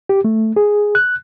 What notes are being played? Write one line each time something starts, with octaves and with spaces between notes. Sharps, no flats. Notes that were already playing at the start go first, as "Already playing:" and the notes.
G4
A3
G#4
F#6